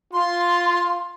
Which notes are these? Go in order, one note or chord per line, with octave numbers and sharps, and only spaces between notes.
F4 C6